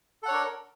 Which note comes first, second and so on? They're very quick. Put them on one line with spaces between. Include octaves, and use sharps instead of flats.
A4 F#5 C#5 D4 A#4